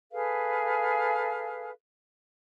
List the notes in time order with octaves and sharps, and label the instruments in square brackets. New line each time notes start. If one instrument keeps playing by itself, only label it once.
[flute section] G#4 A4 B4 F5